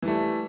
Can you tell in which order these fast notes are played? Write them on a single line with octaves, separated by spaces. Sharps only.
E3 G3 A3